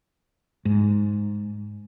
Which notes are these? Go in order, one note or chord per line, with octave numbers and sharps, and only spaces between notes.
G#2